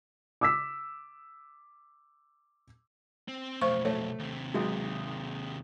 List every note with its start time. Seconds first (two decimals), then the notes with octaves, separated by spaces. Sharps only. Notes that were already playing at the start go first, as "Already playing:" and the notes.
0.41 D6 E6 B6
3.28 C4
3.61 B1 F2 A3 C5 C#6
3.85 A3 C#5
4.19 D#2 C3
4.54 B1 G#3